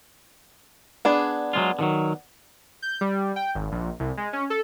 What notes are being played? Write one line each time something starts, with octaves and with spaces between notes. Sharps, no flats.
B3 D4 G#4
F#3 G#3 F4
D3 D#3 F#3
G6
G3
G5
G#1
A#1
C2
G#3
C#4
A4